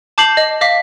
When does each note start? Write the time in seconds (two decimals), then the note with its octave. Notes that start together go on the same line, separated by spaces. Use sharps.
0.18 A5 D6 G6 C7 F#7
0.37 D#5
0.61 D#5 F5 D6 B6